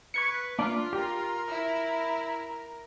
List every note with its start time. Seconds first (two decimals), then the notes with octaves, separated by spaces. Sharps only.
0.14 B4 C#6 G#6 C#7
0.59 A#3 D4 F4 D5
0.93 G4 A#4
1.48 E4